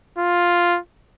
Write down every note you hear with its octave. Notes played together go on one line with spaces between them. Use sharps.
F4